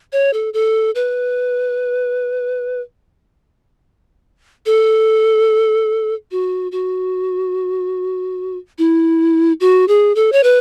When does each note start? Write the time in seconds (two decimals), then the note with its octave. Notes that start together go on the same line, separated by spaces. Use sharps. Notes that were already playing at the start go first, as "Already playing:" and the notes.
0.12 C#5
0.33 A4
0.54 A4
0.95 B4
4.66 A4
6.31 F#4
6.72 F#4
8.78 E4
9.60 F#4
9.88 G#4
10.16 A4
10.32 C#5
10.43 B4